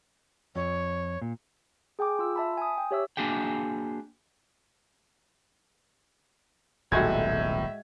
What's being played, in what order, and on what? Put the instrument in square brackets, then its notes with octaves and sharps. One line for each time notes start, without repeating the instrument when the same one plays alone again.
[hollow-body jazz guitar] F2 [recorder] C#5
[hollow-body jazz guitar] A#2
[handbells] G#4 G5 G#5 D6
F4 E6
E5 A5 B5
G#5 D#6
G5
G4 C#5 E5 E6
[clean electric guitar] A#3 D4 F#4 G#4 G5
[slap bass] D#1 B1 [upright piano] A2 G#6 [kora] G#3 F#4 [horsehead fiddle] E5